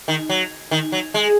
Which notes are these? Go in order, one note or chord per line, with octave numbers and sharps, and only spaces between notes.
D#3
F#3
D#3
F#3
G#3